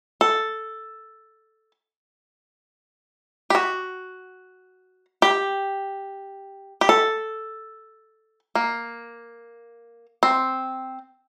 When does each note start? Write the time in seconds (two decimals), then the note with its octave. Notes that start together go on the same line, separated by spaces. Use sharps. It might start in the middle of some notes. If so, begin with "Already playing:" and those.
0.21 A4
3.50 G4
3.55 F#4
5.22 G4
6.81 G4
6.89 A4
8.55 A#3
10.23 C4